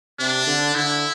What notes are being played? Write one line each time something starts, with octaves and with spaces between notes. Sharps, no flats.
C3 D4
D3
D3 E4